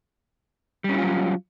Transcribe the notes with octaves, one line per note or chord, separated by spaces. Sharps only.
F#3 G3 C#4 E4 F4